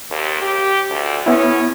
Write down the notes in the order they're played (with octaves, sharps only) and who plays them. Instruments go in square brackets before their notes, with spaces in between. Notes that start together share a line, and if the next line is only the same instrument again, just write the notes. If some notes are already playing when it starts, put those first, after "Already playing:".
[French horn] D#2
G4
D2
[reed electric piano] B3 E4 [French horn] C#4